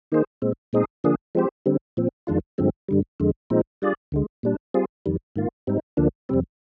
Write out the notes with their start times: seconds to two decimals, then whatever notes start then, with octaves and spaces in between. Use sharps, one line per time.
0.12 D#3 A#3 D#4 G#4 C5
0.42 A#2 G#3 C4
0.73 A#2 G#3 C4 D#4 G#4
1.04 D3 F3 A#3 D4 G#4
1.35 F3 G#3 C4 G4 C5
1.66 D3 G3 C4
1.97 A#2 F3 C4
2.27 F2 D#3 G#3 D4 F4
2.58 G2 D3 F3 G#3 C4
2.88 G2 D3 G3
3.20 F2 D3 G#3
3.50 A#2 F3 G#3 C4 D#4
3.82 G3 D4 F4 G#4 D5
4.12 D2 D3 G#3
4.43 A#2 G3 D4
4.74 G3 C4 F4 G#4
5.06 F2 D#3 G3
5.36 G#2 D#3 A#3 F4
5.67 G#2 G3 C4 D#4
5.97 D2 D3 F3 A#3 D4
6.29 F2 C3 G3 C4